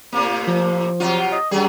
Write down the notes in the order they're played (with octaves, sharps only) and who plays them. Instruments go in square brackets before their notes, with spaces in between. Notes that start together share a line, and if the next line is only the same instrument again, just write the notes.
[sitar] A2 C3 A#3
[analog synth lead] F3
[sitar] C3 F#3 F4
[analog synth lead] D#5
[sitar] F#2 F#3 G#4 [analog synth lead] G3